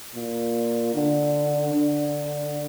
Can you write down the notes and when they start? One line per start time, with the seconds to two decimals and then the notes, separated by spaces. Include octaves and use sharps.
0.15 A#2
0.94 D3
1.74 D3